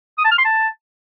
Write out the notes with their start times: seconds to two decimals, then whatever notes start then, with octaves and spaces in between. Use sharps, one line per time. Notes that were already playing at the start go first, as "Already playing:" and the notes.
0.18 D#6
0.25 A5
0.31 F6
0.38 C6
0.45 A5